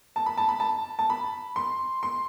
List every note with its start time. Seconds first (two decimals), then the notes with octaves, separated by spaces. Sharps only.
0.16 A5
0.26 B5
0.37 A5
0.49 B5
0.60 A5
0.99 A5
1.10 B5
1.56 C6
2.03 C6